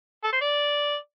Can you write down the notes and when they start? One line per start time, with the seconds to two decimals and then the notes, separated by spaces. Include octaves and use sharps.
0.24 A4
0.33 C5
0.41 D5